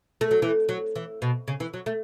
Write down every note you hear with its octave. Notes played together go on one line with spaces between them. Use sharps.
A3
F#3
E3
F#3
E3
B2
C#3
E3
F#3
A3